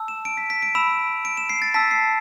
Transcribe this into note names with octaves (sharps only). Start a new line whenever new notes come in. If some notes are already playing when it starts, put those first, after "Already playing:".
Already playing: A5 E6
E7
D7
B6
B6
D7
B5 E6 E7
D7
E7
C7
A6
A5 E6 B6
C7